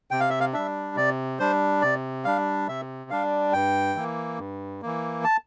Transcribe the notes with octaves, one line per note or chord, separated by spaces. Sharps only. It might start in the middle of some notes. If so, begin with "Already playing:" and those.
C3 G5
F5
E5
F5
G3 D4 E5
C3 D5
G3 D4 C5
C3 D5
G3 D4 F5
C3 E5
G3 D4 F5
G2 G5
E3 A#3
G2
E3 A#3
A5